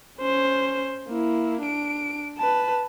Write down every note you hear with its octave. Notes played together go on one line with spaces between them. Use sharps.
C#4 C5
A#3 E4
D4 D7
B4 A5